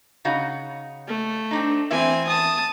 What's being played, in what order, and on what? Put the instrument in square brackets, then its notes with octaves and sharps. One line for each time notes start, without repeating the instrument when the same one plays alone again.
[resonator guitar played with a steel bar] C#3 D#4 F#4
[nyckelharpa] A3
[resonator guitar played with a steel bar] C4 D4 D#4
[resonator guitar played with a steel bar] E2 E4 E5 [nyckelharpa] C4 G#5
[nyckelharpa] A5 D#6